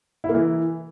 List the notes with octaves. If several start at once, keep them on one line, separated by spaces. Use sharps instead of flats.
E4
A#3
E3